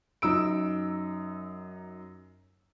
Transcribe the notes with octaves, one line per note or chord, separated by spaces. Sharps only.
F#2 D#4 E6 D7